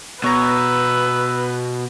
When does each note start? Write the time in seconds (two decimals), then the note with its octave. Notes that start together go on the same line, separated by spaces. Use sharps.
0.24 B2 B4 C#5 A#5 E6